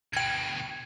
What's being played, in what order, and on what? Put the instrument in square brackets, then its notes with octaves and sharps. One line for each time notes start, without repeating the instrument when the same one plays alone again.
[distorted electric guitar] D2 B2 [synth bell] G5 G#6